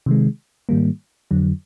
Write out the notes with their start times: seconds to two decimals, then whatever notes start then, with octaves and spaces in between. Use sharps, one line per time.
0.06 C3 D#3 G#3
0.69 G#2 D#3 G3 A#3
1.31 F2 D3 F#3